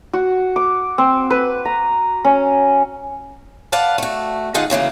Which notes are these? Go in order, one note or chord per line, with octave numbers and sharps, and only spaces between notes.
F#4
D6
C4
B4
A#5
C#4
B4 D5 F5 F#5 A5
A3 F#4
G#2 D3 D#4 F4 G#4 F#5
D2 C#3 E3 A#3